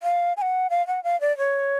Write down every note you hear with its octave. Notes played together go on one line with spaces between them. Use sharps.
F5
G#5
F#5
F5
F#5
F5
D5
C#5